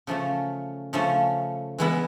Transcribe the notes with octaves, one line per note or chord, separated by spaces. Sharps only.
C#3 F3 A3 C#4
C#3 F3 A3 C#4
E3 G#3 B3 E4